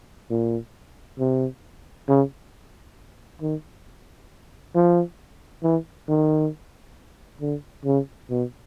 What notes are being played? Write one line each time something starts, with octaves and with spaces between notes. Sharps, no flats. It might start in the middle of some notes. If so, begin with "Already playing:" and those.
A#2
C3
C#3
D#3
F3
E3
D#3
D3
C#3
B2